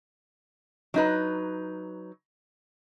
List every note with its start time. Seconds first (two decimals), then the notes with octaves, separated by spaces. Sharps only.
0.94 F#3 D#4 B4